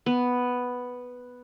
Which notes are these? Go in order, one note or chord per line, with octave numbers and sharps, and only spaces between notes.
B3